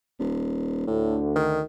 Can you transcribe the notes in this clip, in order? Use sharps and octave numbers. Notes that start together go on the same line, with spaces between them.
D#1
D2 A2 D3
D#3